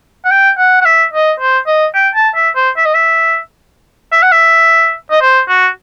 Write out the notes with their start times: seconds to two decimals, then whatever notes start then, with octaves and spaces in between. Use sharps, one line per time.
0.25 F#5
0.31 G5
0.58 F#5
0.81 F#5
0.86 E5
1.13 D#5
1.40 C5
1.67 D#5
1.95 G5
2.15 A5
2.35 E5
2.56 C5
2.77 E5
2.85 D#5
2.94 E5
4.12 E5
4.22 F#5
4.32 E5
5.11 D#5
5.22 C5
5.48 F#4